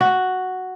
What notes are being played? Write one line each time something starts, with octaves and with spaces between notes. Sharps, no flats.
F#4